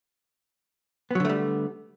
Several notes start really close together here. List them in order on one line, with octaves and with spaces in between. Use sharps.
B3 F#3 D3 A3 G3